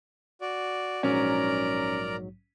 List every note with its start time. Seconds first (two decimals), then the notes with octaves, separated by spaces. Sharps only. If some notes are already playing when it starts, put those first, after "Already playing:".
0.41 F#4 D5
1.03 A#1 G#2 F#3 C#4 A#4 D5 A#5